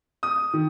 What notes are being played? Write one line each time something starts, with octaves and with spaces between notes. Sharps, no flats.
D#6
D#3